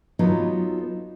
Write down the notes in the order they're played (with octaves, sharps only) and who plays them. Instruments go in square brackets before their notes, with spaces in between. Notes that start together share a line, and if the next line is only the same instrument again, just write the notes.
[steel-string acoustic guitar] F#3 B3 D#4 F4 A4